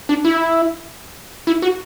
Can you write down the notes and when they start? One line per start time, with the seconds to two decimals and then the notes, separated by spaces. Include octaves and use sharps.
0.09 D4
0.25 E4
1.47 E4
1.62 F#4